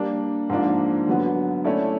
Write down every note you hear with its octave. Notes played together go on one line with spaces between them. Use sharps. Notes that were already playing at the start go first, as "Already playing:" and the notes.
Already playing: G3 A#3 D4
G#2 F3 A#3 D4
D3 F#3 B3
A3 C#4 E4 A4 D5